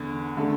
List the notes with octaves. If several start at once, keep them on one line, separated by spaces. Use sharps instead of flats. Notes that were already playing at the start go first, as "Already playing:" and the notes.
Already playing: E2 D3
D3 A3